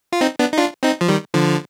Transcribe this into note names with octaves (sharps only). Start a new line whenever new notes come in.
F4
C4 D#4
B3 D4
D#4
D4 F4
C4 D#4
F3
D#3 G3
D3 F3